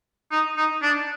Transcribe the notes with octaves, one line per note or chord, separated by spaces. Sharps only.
D#4
D#4
D4